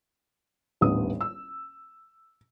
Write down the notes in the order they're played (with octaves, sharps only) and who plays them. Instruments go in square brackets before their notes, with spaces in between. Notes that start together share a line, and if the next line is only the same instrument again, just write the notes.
[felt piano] D#1 A1 B3 D4 D#6
E6